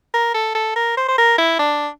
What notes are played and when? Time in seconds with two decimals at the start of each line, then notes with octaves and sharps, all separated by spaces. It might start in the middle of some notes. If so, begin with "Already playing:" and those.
0.14 A#4
0.34 A4
0.55 A4
0.76 A#4
0.97 C5
1.08 C5
1.18 A#4
1.38 E4
1.59 D4